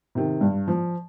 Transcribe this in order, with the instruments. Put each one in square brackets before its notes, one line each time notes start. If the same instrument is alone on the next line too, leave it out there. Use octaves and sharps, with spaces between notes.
[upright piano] C3 D#3
G2
F3